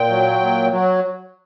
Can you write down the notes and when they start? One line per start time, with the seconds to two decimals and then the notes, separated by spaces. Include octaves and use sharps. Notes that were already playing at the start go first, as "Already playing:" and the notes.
Already playing: A#2 G5
0.09 F#3
0.40 A#2
0.72 F#3